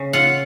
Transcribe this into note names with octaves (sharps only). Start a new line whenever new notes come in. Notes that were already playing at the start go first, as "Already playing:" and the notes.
Already playing: C#3
F4 F#5